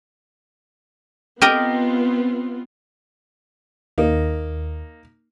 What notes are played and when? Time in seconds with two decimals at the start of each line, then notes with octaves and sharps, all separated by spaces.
1.42 B3 C4 F4 G4 A#4 D#5
3.98 D#2 A#3 D#4